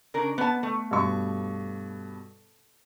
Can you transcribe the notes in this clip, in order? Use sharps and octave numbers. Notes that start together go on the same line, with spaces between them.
C#3 D4 A#4
B3 B4 A5
A3
G2 B2 C#6